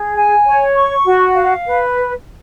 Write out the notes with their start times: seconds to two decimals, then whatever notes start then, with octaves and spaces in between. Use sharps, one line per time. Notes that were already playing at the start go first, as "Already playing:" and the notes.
Already playing: G#4
0.15 G#5
0.46 C#5
0.75 C#6
1.06 F#4
1.36 F5
1.66 B4